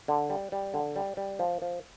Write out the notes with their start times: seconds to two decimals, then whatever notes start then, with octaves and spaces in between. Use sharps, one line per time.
0.08 D3
0.30 G3
0.52 G3
0.74 D3
0.96 G3
1.17 G3
1.39 F3
1.62 F3